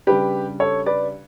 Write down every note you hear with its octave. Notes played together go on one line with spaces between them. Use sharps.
C#3 G3 D4 G4 B4
A4 C#5
B4 D5